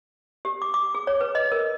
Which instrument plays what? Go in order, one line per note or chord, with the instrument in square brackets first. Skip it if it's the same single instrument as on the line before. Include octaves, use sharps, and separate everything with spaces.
[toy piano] G4
D6
D6
G#4
C#5
B4
D#5
A#4